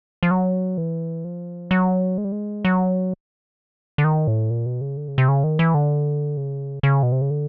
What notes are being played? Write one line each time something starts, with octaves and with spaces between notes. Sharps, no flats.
F3
F#3
E3
F3
F#3
G#3
G3
G#3
F#3
D3
D#3
A2
A#2
B2
C#3
D3
C#3
C3
C#3
D#3
E3
D3
C#3
C#3
B2
C3
C#3
D3